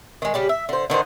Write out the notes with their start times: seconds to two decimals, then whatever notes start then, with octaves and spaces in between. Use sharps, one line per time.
0.22 D#3 G#3
0.34 C#3 G3 G4
0.49 E5
0.69 D3 C5
0.90 D3 D#3 D#4 C5